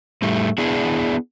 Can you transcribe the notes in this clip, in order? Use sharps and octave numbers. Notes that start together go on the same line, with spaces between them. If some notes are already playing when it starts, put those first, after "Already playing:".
A2 G3 A3
B3 D4 E4 G#4